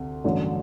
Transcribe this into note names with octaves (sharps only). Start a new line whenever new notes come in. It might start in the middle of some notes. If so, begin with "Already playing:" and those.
Already playing: D2 C3
A1 G2 D3 F#3 A3